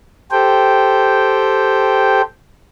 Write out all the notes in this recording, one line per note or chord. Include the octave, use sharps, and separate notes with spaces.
G4 A4 C5 G5